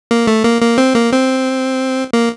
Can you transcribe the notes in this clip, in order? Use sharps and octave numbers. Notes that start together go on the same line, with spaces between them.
A#3
A3
A#3
A#3
C4
A#3
C4
A#3